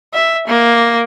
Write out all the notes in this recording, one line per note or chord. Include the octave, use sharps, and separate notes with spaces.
E5
A#3